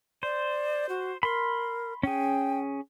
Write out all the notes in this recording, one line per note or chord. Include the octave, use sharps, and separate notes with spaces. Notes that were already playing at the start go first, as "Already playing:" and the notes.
C5 D5
F#4
A#4 B5 C6
C#4 G#4 G5